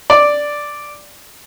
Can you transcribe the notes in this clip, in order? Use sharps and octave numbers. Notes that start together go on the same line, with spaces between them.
D5